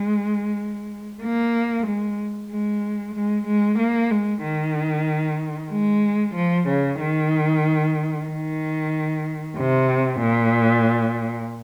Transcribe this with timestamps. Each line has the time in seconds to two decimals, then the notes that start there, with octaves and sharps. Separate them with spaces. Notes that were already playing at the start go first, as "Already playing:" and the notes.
Already playing: G#3
1.23 A#3
1.87 G#3
2.51 G#3
3.15 G#3
3.47 G#3
3.79 A#3
4.11 G#3
4.43 D#3
5.71 G#3
6.35 F3
6.68 C#3
7.00 D#3
8.28 D#3
9.57 C3
10.20 A#2